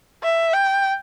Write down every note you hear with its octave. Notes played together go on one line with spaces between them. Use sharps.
E5
G5